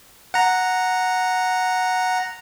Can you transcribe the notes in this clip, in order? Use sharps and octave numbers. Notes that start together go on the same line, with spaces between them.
F#5 A#5